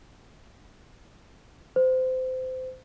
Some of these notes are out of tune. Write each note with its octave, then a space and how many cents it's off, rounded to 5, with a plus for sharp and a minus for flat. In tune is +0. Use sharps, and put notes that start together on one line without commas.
C5 -25